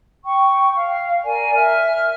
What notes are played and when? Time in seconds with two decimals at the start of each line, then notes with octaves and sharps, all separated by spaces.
0.24 G5 C#6
0.75 F5
1.23 A#4 D5 G#5
1.55 E5 F6